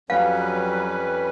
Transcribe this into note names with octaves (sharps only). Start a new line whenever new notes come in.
F2 F#3 G3 C#4 B4 F5